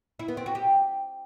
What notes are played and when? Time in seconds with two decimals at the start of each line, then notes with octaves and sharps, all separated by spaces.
0.19 E4
0.28 B3
0.37 C4
0.46 F#4
0.55 G4